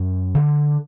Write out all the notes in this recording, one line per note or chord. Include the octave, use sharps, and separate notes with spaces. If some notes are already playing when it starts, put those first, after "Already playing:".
Already playing: F#2
D3